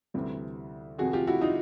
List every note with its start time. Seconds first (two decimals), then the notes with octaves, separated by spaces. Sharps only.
0.14 D2 C3 E3 G3 C4
0.98 F2 C3 D#3 F#4 G#4
1.13 F4 G4
1.27 E4 F#4
1.41 D#4 F4